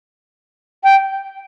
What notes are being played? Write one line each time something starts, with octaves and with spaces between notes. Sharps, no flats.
G5